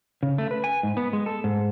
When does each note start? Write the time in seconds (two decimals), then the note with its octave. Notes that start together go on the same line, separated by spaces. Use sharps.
0.23 C#3
0.38 A3
0.51 B4
0.64 G#5
0.83 G#2
0.97 B3
1.13 G#3
1.26 A4
1.44 G#2